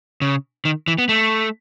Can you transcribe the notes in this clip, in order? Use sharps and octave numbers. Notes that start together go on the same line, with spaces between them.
C#3
D#3
E3
B3
A3